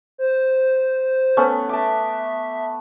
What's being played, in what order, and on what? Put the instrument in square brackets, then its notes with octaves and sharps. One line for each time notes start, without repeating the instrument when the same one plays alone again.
[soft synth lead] C5
[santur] A3 B3 C#4
[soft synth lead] E5 [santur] A5 D6